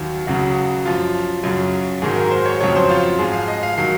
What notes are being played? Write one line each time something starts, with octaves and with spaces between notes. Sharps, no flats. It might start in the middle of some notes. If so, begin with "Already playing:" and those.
Already playing: D#2 D#3 F#3
C#2 C#3 F#3 F#4
F#2 F3 F4
F#2 C#3 F#3
G#2 D#3 F#3 G#4
A#4
C5
C#5
F2 C#3 F#3 C#5
C5
F4
G#2 F3 G#4
F5
D#5
F5
D#3 F#3 F5